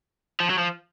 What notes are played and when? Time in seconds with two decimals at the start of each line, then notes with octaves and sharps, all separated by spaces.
0.40 F3
0.50 F#3
0.58 F3